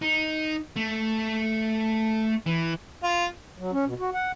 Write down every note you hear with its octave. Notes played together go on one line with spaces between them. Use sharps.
D#4
A3
E3
F4
F#3
C#4
B2
F#4
F#5